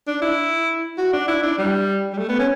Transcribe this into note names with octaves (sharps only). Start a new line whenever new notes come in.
D4
E4
F#4
D4
E4
D4
G3
G3
A3
B3
C#4